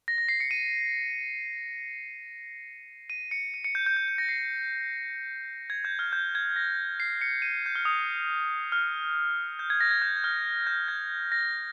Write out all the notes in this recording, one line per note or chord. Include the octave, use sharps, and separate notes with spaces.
A#6
A#6
C7
C#7
D#7
D#7
C#7
D#7
C#7
G6
G6
G6
G6
A#6
C7
G#6
G6
F6
G6
G#6
A#6
C7
C#7
D#7
G6
F6
D#6
F6
G6
G#6
A#6
G#6
G6
G6
F6
G6
G#6
A#6